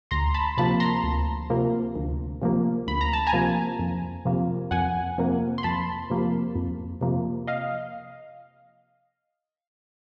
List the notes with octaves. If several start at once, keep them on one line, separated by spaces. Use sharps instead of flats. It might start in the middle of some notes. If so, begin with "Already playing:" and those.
D2 A#5 C6
A5 B5
C3 F3 A#3 A5 B5
A#5 C6
D2
C3 F3 A#3
D2
C3 F3 A#3
D2 B5
A#5
A5
G#5 A#5
C3 F3 A#3
F2
C3 F3 A#3
F2 F#5 G#5
C3 F3 A#3
C6
F2 A5 B5
C3 F3 A#3
F2
C3 F3 A#3
D#5 F5